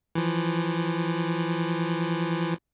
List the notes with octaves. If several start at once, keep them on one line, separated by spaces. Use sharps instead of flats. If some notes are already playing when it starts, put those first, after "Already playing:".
E3 F3